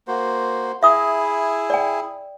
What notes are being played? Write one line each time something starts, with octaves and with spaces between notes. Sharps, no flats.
A#3 F#4 C5
E4 G#4 E5 D#6
D5 G5